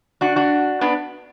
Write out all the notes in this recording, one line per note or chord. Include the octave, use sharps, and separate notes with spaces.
D4 F#4
D4 F#4
B3 D4